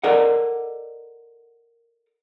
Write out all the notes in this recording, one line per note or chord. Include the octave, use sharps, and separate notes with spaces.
A4 A#4 D5 D#5 F#5